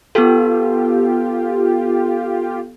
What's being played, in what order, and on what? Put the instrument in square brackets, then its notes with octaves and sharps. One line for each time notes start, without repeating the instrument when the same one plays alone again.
[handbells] B3 A4 [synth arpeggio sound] F4 G4